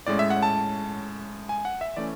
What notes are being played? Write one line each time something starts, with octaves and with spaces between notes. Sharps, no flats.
A2 G#3 C#4 D5
E5
F#5
A5
G#5
F#5
E5
E3 A3 C#4 D5